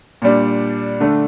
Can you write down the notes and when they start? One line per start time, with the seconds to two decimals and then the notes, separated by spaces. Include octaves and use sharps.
0.22 A#2 G3 D4
1.00 D3 A3 D4